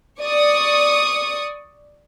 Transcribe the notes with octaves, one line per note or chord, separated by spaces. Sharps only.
D5 C#6 D#6